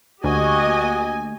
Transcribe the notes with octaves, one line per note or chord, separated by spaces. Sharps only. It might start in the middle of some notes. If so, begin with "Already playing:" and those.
D2 A#3 F#4 G4 D#5 G#5 C#6